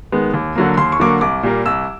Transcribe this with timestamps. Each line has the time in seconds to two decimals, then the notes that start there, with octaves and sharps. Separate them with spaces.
0.12 D#3 G#3 B3
0.33 D#2
0.55 D3 F#3 A#3
0.77 D#2 C6
0.92 C#6
1.00 D3 F#3 A#3 D6
1.07 C#6
1.21 C2 D6
1.43 A#2 G3 A#3
1.66 C2 E6